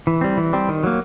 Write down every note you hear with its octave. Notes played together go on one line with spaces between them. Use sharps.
E3
G3 C4
E3
G3 C4
D#3
F#3 A#3